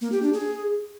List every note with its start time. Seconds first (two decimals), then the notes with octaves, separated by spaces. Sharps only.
0.01 A#3
0.12 G4
0.22 D4
0.33 G#4